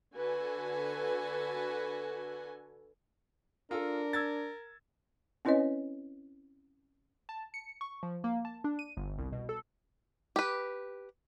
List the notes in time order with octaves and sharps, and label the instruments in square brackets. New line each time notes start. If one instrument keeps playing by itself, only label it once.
[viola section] D3 F#4 A4 B4 G#5
[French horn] D4 [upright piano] F4 A4 [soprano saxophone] A#4
[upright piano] E6 G#6 A6
[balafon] C4 C#4 E4 B4 C#5 D#5
[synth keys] A5
C#7
C#6
F3
A#3
A5
D4
D#7
G1
C2
B2
A4
[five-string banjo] G4 B4